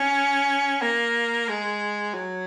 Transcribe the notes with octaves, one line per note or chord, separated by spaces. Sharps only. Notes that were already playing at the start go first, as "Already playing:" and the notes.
Already playing: C#4
A#3
G#3
F#3